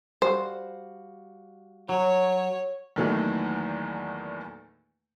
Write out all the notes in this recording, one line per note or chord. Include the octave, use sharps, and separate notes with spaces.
G3 F#4 C5 F5
F#3 C#5
E2 A#2 D#3 E3 F#3 A3